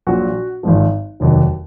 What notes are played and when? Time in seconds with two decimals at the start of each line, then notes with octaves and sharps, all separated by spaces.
0.07 A#1 A#2 F#3 F#4
0.63 G#1 G#2 F3
1.20 F1 D#2 D#3 F#3